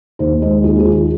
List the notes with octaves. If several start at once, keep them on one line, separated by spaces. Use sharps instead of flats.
D#2 C5
G#3 C5
D#2 G#4
G#4
D#3 F4